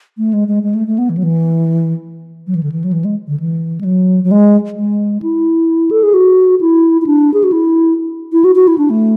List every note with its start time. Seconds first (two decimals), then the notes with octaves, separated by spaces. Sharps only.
0.18 A3
0.33 G#3
0.48 G#3
0.63 G#3
0.75 A3
0.87 A3
0.98 B3
1.10 E3
1.17 F#3
1.23 E3
2.47 F#3
2.55 E3
2.63 D3
2.72 E3
2.84 F#3
2.93 E3
3.04 G#3
3.28 D3
3.40 E3
3.81 G#3
3.84 F#3
4.24 F#3
4.31 G#3
4.77 G#3
5.22 E4
5.91 A4
6.03 G#4
6.14 F#4
6.61 E4
7.02 E4
7.06 D4
7.34 G#4
7.44 F#4
7.52 E4
8.33 E4
8.44 F#4
8.56 F#4
8.67 E4
8.78 D4
8.90 A3